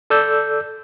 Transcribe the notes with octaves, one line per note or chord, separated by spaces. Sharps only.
A4 D5 E6 G6